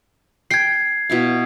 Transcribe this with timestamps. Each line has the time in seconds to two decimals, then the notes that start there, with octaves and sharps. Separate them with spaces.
0.51 G5 C6 G#6 C7
1.10 B2 E4 F5